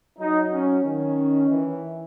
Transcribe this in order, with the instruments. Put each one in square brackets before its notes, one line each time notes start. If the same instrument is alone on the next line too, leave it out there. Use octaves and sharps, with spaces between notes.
[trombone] F#3 [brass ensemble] D#4
[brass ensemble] C#4
[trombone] D#3 [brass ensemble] C#4
[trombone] E3